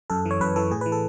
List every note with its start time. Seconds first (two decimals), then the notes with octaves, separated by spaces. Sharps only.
0.10 F#2 A4
0.26 E3
0.31 C#5
0.40 F#2 B4
0.56 E3 A4
0.71 A2 G#4
0.81 E3 B4
0.92 A4